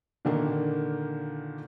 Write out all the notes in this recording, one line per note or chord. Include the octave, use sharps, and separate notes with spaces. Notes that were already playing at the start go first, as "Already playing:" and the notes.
A#2 D3 D#3 A#3